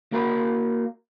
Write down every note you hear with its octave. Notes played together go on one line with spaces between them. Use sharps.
A#3 F#4 A#4 F5 A#5 B5